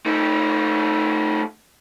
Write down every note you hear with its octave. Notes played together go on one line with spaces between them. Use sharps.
A3 D#4